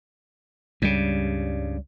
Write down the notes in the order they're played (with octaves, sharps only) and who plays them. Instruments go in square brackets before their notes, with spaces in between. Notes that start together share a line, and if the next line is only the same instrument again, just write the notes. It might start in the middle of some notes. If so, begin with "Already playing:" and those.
[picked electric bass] C#2 G3 [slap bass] G2 C#3